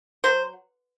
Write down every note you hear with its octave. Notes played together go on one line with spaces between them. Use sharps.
F#3 C5